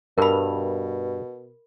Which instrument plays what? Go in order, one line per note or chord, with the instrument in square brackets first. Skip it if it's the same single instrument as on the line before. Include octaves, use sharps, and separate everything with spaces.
[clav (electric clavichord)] G2 [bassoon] B2 [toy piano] A#4 B5